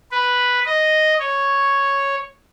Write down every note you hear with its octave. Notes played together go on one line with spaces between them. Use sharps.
B4
D#5
C#5